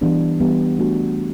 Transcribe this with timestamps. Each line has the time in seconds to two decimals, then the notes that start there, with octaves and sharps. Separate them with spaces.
0.01 E3 G3 B3 D4 G4
0.40 E3 G3 B3 D4 G4
0.79 A3 D4 F#4